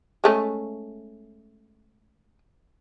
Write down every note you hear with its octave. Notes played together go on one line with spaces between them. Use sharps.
G#3 A3 C#4